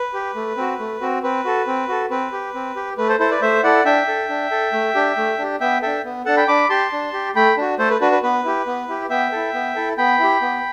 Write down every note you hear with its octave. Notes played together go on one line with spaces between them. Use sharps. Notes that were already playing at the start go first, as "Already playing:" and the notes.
Already playing: B4
G4
A3
C4 F#4
A3
C4 F#4
C4 B4
F#4 A4
C4
F#4 A4
C4 B4
G4
C4
G4
A3 B4
A4 C5
E4 A4 C5
B4 D5
A3 C5 E5
E4 A4 D5 F#5
D4 E5 G5
A4
D4
A4
A3
D4 G4
A3
D4 G4
B3 E5 G5
D4 A4 E5 G5
B3
D4 A4 F#5 A5
G5 B5
D4 B5 D6
G4 A5 C6
D4
G4
A3 G5 B5
D4 F#4
A3 A4 C5
B4
D4 F#4 B4
B4
B3 B4
E4 G4
B3
E4 G4
B3 E5 G5
E4 A4
B3
E4 A4
B3 G5 B5
E4 G4
B3